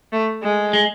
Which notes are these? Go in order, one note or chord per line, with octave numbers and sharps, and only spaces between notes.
A3
G#3
G#3